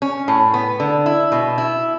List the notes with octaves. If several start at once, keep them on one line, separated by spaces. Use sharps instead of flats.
C#4
A2
B3
D3
E4
B2
E4